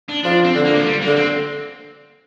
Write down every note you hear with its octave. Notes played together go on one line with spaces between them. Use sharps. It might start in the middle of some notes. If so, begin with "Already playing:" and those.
D4
F3 D4
C4
D3
A#3
F3
G3
A#3
D3
C4